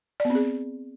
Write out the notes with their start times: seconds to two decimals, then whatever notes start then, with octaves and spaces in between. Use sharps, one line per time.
0.20 D5
0.25 B3
0.30 C4
0.35 G#4